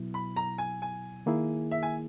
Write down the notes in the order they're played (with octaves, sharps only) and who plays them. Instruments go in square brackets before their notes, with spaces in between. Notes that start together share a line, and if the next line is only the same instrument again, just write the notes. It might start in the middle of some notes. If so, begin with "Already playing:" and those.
Already playing: [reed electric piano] B2 F#3 B3 E4
[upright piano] B5
A#5
G#5
G#5
[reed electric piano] D#3 A#3 E4 G#4
[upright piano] E5
G#5